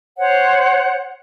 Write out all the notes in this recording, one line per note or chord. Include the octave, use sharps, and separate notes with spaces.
C5 C#5 F#5